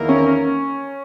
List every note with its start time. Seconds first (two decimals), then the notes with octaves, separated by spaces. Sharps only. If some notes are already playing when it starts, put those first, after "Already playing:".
Already playing: E2 D#3 A#3 E4 A#4
0.09 C#4